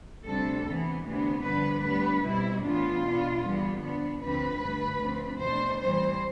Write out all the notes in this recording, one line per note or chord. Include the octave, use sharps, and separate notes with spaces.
D2 C3 G3 D4 A4
C3 E3 B3
D2 C3 E3 B3 D4
G2 D3 F3 B3 D4 B4
A2 G3 B3 D4 B4
B2 G3 C4 E4
A2 E3 B3 D4 F4
B2 B3 D4
E2 D3 G3 B3
G2 F3 B3 D4
D2 D3 F3 C4 B4
G2 D3 A3
D2 D3 F3 A3 C4
E2 B2 A3 D4 C5
A2 E3 G3 C4 C5